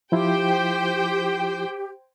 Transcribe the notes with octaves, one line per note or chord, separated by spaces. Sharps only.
F3 E4 F4 G4 C5 G5